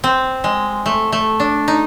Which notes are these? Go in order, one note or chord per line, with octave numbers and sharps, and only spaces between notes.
C4
G#3
A3
A3
D4
D#4